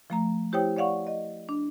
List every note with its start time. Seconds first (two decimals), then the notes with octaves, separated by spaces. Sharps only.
0.10 F3 A3 A#5
0.52 E4 G4 C5 C#5 G5 D#6
0.77 C#5 D5 F5 F#5 C#6
1.07 D#5
1.49 D4